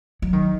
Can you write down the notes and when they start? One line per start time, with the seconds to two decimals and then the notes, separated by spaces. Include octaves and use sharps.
0.22 F#3
0.33 D#3